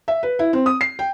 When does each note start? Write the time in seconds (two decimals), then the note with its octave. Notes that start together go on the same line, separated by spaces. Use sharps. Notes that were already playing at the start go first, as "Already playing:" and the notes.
0.08 E5
0.23 B4
0.39 E4
0.53 C4
0.66 D#6
0.81 C7
0.99 G5